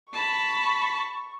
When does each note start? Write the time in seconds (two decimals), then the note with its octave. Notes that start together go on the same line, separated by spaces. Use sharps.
0.13 A5 B5 C#6